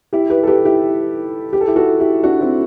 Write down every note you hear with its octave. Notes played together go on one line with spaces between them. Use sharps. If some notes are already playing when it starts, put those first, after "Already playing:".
E4 G4
G4 B4
A4
G4 B4
E4 G4
G4
A4
E4 G4
F#4 A4
E4 G4
D4 F#4
C4 E4